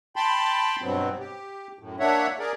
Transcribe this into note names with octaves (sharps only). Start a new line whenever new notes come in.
G5 A5 B5 C6
G2 B2 F#3 B3 C4
G4
F#2 A2
A#3 D4 C#5 E5 F#5
G#4 A#4 D5